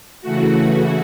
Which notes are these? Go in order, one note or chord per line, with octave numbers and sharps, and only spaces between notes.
C#3 E3 A3 F#4